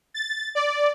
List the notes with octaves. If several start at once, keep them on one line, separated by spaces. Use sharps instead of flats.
A6
D5